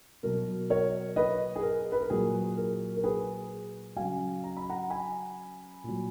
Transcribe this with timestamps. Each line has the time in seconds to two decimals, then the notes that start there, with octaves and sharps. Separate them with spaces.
0.23 B2 F#3 A#4
0.70 A#4 C#5
1.16 B4 D#5
1.56 G#4
1.63 A#4
1.92 B4
2.00 A#4
2.10 A#2 F#3 G#4
2.57 A#4
2.97 A#4
3.03 G#4 B4
3.96 C#3 F#3 F5 G#5
4.44 A#5
4.57 B5
4.70 F#5 A#5
4.90 G#5 B5
5.84 A#2 F#3